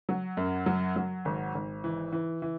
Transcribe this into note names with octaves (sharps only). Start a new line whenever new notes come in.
F#3
F#2
F#3
F#3
G#1
G#1
E3
E3
E3